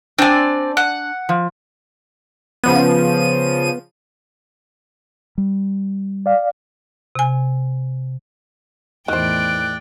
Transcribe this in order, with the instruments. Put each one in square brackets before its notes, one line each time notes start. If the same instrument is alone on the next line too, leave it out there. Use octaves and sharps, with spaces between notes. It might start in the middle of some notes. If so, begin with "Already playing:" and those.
[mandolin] C4 D5 [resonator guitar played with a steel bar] D4 G#5
[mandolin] F#5
[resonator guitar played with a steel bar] F3
[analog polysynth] C#3 F3 D#7 [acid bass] B3
[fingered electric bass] G3
[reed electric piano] D5 F5
[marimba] C3 G#5
[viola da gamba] E2 A2 [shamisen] D#3 C5 [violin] D5 G5 [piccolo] F#6